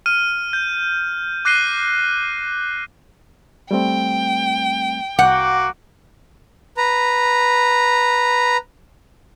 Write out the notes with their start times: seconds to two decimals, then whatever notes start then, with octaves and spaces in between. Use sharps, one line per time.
0.06 F6 D#7
0.53 G6
1.45 D6 F#6 A#6 C7 D#7 G7
3.71 G3 A3 C4 G5
5.19 C2 A#3 F#4 F#5 D6 G6
6.77 B4 A#5